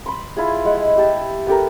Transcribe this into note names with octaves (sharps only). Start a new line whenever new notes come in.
B5 C6
E4 F4 G#4
G#3 F#5
G4 A5
B3 G4 A4 A#4